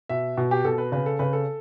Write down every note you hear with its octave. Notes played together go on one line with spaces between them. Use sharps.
B2 E5
B2
G4
B2 A4
B4
C#3 B4
A4
C#3 B4
A4